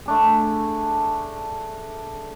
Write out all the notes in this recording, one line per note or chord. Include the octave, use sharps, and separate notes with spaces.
A3 D4 G#4